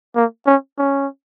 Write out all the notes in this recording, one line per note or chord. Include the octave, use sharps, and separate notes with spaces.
A#3
C#4
C#4